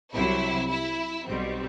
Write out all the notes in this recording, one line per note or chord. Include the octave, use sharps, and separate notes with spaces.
C2 C3 F#3 E4
E4
B1 B2 G3 C4